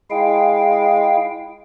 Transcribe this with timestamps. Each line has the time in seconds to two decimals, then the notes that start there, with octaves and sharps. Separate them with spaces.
0.11 G#3 E4 F5 G5